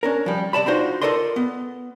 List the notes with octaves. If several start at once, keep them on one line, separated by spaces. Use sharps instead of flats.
C#4 D4 A#4
F3 G3
C3 D5 A5 B5
D4 D#4 F4 F#4 C5
F4 A4 A#4 D5 D#5 C6
B3